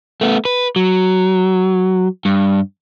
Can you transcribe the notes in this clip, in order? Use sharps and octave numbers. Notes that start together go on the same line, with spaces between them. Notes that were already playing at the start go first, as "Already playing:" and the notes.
A3 B3
B4
F#3
G2